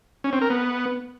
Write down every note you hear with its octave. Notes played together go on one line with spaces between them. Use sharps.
C#4
C4
A#4
B3